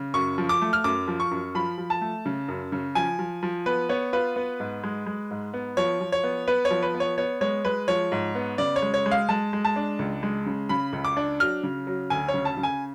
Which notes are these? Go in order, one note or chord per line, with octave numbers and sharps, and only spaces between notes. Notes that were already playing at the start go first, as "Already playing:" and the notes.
Already playing: C#3
F#2 C#6
F3
D6
A3
F6
F#2 D6
F3
C#6
F#2
F3 B5
F3
A5
A3
C#3
F#2
C#3
F3 G#5
F3
F3
B3 B4
B3 C#5
F4 B4
B3
G#2
G#3
G#3
G#2
B3
F3 C#5
F3
C#5
B3
B3 B4
C#5
F3
B4
B3
C#5
B3 C#5
G#3 C#5
G#3 B4
F3 C#5
G#2
B3
C#3 D5
C#5
G#3
C#5
G#3
F5
G#3 A5
G#3
A5
D4
C#2
G#3
C#3
C#3 B5
C#2
D6
D4
F#3 F6
C#3
F#3
D2 G#5
C#5
C#3
A5
C#3
G#5